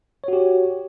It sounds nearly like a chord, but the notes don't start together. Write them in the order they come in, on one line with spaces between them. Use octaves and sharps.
C#5 F#4 G4